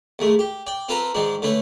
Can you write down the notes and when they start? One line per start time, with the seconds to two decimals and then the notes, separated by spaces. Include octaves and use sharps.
0.19 D#2 G#3 A3
0.39 G4
0.67 D5 G5
0.89 C4 F4 A4 B4 A#5
1.14 G#2 D#3 G#3 D4
1.42 D3 A3 C#4 B4